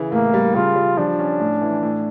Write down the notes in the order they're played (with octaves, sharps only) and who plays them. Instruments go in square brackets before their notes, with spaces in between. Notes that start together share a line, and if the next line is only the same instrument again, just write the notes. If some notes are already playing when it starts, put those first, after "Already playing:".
Already playing: [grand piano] C#3 E3
[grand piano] A2 [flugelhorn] A#3
[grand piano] G3
[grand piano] C#3 [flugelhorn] F4
[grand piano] G3
[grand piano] F3 [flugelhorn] D4
[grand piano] C#4
A2
E3
A2